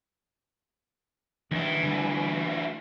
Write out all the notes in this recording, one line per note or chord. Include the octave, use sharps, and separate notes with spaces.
D2 D#3 E3
D3 G3